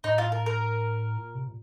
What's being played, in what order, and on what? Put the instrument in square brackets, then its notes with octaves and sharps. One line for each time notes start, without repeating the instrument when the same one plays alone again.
[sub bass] A2 [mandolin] D#4
[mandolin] F4
A#4
A#4
[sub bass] A#2
C3
A#2